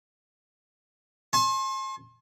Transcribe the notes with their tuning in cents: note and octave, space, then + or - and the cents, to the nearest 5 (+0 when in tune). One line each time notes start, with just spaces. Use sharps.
A5 -45 C6 +35